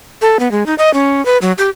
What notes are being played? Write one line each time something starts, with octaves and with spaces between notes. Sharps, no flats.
A4
B3
G#3
D#4
D#5
C#4
B4
F#3
G4